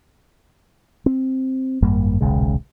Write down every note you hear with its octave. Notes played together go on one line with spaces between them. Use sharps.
C4
G#1 F#2 G3 A#3
D#1 B1 C#3 G#3